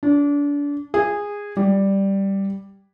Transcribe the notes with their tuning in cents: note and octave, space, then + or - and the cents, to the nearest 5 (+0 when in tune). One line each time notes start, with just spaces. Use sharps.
D4 -30
G#4 -15
G3 +0